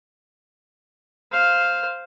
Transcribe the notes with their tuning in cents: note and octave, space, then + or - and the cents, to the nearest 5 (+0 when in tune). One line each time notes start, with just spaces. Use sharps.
C5 +0 F5 +0